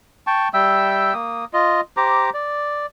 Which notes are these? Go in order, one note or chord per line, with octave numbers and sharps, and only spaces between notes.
G5 A5 C#6
G3 E5 G5 E6
A#3 D#6
F4 D#5
G4 C5 A#5 D6
D5